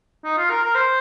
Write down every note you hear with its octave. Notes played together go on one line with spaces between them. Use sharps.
D#4
F4
A#4
A#4
C5